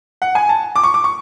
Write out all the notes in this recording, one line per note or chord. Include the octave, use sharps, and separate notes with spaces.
F#5
G#5
A5
D6
C#6
D6
C#6